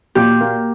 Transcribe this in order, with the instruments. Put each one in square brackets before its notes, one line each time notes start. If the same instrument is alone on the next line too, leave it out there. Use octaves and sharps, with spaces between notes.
[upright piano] A#2 [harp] G4
[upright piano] A#3